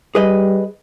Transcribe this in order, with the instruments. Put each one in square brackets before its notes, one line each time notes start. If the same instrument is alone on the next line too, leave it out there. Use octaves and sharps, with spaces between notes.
[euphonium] G3 [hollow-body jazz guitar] G#4 B4 D#5